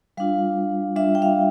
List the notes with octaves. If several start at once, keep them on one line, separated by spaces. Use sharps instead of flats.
G3 D4 F4 F5
G3 D4 F4 E5
G5
F5